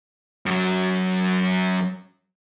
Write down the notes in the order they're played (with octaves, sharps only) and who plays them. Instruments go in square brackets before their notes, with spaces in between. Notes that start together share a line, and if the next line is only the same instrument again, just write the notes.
[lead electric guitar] F#2 F#3